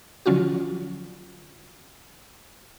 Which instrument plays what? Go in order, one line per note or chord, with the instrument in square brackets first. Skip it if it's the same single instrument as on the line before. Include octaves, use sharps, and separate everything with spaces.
[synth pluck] D3 F3 F#3 C#4 F4 F#4